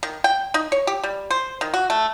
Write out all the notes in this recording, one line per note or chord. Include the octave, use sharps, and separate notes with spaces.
D#3
G5
D#4
C#5
G4
G3
C5
D#3
F#4
A3